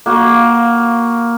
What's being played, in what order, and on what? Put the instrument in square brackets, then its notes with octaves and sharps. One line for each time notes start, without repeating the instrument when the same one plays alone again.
[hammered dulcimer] A#3 F#4 F5